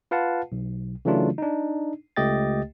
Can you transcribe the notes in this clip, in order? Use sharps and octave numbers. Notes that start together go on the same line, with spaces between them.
F4 B4 F5 F#5 A5
B1
C#3 E3 F#3 A3 D4 F4
D4 D#4
C#2 A3 G4 D#5 G5 A6